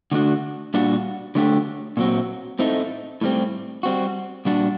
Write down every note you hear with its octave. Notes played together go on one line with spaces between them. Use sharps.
D3 A3 D4 F#4
A#2 G3 D4 F#4
D3 F#3 A3 D4 G4
A#2 F#3 C4 F#4
A2 A3 C4 D#4
A2 G3 C4
G3 C4 F#4
A#2 G3 D4 F#4